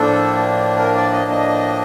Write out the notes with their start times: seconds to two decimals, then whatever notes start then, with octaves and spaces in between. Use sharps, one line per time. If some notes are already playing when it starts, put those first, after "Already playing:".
Already playing: A2 F3 A#3 D4 A4
0.77 A#4
0.95 D5
1.13 D#5
1.30 D#5